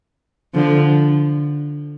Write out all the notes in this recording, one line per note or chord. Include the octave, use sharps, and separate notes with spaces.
D3 F3